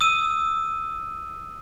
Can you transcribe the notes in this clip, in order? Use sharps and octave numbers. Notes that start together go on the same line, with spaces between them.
D#6 E6 D#7